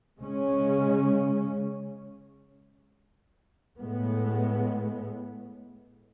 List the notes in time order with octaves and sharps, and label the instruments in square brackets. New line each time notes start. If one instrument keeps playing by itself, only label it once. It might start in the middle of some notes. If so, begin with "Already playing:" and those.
[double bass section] C#3 G#3 C#4
A2 G#3 B3